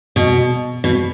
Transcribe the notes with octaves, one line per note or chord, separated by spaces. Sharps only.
B2
B2